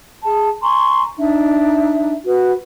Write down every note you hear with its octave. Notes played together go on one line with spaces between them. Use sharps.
G#4 A5
G#5 A#5 C6 C#6
D4 D#4 E5
F#4 B4